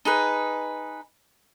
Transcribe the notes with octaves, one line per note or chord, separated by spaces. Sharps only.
D#4 G#4 B4